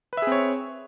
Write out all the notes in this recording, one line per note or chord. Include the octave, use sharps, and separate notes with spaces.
C4 G#4 B4 C#5 E5